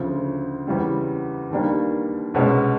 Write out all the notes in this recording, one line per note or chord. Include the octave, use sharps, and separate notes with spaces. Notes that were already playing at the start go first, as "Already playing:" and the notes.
Already playing: D2 C#3 F3
E2 C#3 E3 G3 C4
D#2 D#3 G3 A#3 D4
C2 B2 G#3 C#4